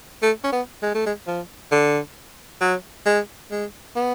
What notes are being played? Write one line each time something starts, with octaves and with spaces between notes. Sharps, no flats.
A3
C#4
B3
G#3
A3
G#3
F3
D3
F#3
G#3
G#3
B3